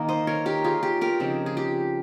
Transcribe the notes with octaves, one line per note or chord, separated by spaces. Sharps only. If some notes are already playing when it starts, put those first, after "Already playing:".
Already playing: D#3 A#3 D#4 A#4
C5 D#5
A#4 C#5
G4 A#4
F4 G#4
G4
G4 A#4
C#3 F3 C4 D#4
G#4
G4